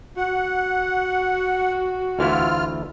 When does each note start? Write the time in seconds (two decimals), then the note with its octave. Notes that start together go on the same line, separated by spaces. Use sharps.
0.17 F#4 F#5
2.19 D2 E3 E4 F4 F6